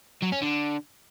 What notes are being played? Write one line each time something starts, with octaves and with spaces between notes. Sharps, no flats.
F#3
C#4
D3